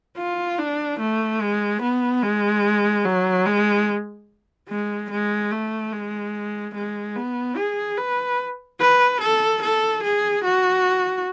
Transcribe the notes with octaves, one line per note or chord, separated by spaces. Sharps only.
F4
D4
A3
G#3
B3
G#3
F#3
G#3
G#3
G#3
A3
G#3
G#3
B3
G#4
B4
B4
A4
A4
G#4
F#4